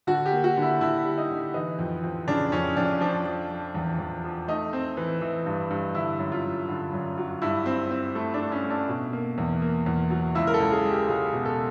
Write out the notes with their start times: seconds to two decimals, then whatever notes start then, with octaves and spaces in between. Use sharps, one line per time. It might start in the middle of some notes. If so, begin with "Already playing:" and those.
0.07 D3 F#4
0.26 G4
0.32 A#3
0.44 F#4
0.57 D3
0.62 E4
0.81 D3 E4
1.05 G3
1.18 D#4
1.30 D3
1.54 E3 D#4
1.79 F2
2.03 F2
2.28 C#3 D4
2.52 F2 C#4
2.76 F2 D4
3.01 F3 D4
3.26 F3
3.50 F3
3.75 E2
3.98 E2
4.24 F3
4.48 A3 D#4
4.73 C4
4.97 E3
5.21 E3
5.46 G2
5.70 G2
5.94 D3 E4
6.19 F#2
6.32 F4
6.43 F#2
6.68 D3
6.93 F#2
7.18 F#3
7.42 G2 E4
7.66 C4
7.91 C4
8.15 A3 E4
8.34 D4
8.39 A3
8.52 C#4
8.64 A3
8.70 D4
8.88 B2
9.13 A#3
9.38 E2
9.62 A#3
9.86 E2
10.10 F#3
10.35 C#2 E4
10.47 A#4
10.54 A4
10.60 C#2
10.72 G#4
10.84 G#3
10.90 G4
11.09 C#2 G#4
11.33 B2
11.45 A4